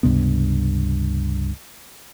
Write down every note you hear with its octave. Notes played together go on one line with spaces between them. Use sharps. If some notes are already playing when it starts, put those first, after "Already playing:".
C#2 G2 C3 B3